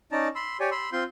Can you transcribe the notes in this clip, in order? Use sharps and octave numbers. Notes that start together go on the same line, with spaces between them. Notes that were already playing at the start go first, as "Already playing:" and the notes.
C#4 D#4 D5 A5 A#5
B5 C6 E6
G4 C#5 D5 G#5
B5 C6 E6
C4 F4 C6 G6